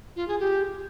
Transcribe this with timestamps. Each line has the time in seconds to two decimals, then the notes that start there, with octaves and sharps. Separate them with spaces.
0.16 F4
0.28 G#4
0.40 G4